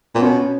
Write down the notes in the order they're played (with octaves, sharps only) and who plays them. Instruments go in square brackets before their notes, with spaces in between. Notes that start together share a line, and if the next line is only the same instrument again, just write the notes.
[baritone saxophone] A#2 [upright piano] B3
[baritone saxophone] B2 [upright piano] C#4